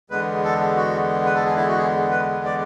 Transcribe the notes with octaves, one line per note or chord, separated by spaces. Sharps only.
E2 D3 G#3 B3 B4
A4
F#4
B4
A4
G#4
E4
F#4
G#4
B4
D5